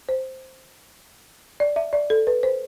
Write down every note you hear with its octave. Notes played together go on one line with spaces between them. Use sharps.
C5
D5
E5
D5
A4
B4
C5